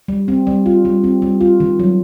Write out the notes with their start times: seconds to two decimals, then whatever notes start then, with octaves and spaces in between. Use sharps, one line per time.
0.08 G3
0.28 C4
0.47 G3
0.66 F4
0.85 G3
1.04 C4
1.22 G3
1.41 F4
1.60 D#3
1.80 F#3